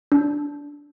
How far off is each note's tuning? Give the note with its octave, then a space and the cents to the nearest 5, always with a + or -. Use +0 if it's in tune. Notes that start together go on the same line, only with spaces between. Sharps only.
D4 -15